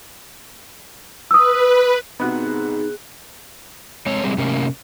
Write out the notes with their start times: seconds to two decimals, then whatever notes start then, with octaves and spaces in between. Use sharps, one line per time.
1.31 B4 D#6 E6
2.20 G#2 C3 B3 D#4 F#4 F#6
4.06 G#3 C4 C#5
4.24 G3 G#3 C4
4.38 C3 A3 A#3 C#4